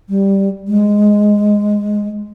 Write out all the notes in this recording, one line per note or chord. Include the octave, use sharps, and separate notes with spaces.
G3
G#3